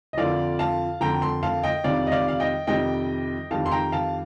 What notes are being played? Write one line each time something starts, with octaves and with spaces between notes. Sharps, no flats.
D#5
F2 D3 F3 D5 F5
F5 A5
F2 D3 F3 G5 A#5
A5 C6
F5 A5
D#5 G5
F2 C3 D#3 G3 D5 F5
D#5
D5 F5
F5
D#5 G5
F2 C3 D#3 G3 D#5 G5
F2 D#3 G3 F5 A5
C6
G5 A#5
F5 A5